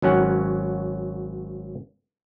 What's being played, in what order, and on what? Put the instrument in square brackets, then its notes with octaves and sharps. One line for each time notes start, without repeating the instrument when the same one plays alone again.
[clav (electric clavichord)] G#1 F#3 C#4 F#5